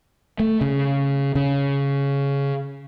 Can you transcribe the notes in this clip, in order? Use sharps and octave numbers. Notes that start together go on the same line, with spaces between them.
A3
C#3
C#3